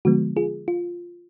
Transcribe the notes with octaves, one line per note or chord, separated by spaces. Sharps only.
D3 F3 G#3 B3 F#4
F4 G#4
F4